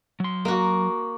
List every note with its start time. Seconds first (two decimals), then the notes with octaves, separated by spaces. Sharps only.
0.20 F#3 C6
0.45 A#3 F#4